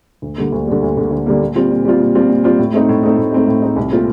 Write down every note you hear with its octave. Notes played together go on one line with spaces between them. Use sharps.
D2
D3 G3 A#3
D2
D3 G3 A#3
D2
D3 G3 A#3
D2
D3 G3 A#3
A#2
G3 C4 F4
A#2
G3 C4 F4
A#2
G3 C4 F4
A#2
G3 C4 F4
A2
A3 C4 D#4
A2
A3 C4 D#4
A2
A3 C4 D#4
A2
A3 C4 D#4
C2
A#2 A3 C4 F4